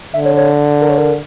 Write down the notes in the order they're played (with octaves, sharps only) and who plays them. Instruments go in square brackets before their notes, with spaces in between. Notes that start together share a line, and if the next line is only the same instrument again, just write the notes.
[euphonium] D3 [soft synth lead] E5
[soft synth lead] C#5
C#5
A#4
C#5
A#4